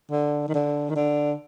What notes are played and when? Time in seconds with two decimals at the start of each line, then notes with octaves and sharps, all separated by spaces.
0.11 D3
0.48 D#3
0.54 D3
0.90 D#3
0.95 D3